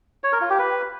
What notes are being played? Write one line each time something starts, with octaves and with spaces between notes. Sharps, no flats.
C#5
A#4
F4
G4
B4